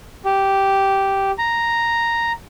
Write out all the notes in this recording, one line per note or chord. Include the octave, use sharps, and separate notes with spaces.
G4
A#5